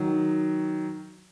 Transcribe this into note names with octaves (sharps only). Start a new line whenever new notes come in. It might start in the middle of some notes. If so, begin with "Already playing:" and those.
Already playing: D#3 F#3